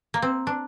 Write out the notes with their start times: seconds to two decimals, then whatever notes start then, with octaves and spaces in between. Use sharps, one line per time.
0.14 A#3
0.22 C4
0.47 D4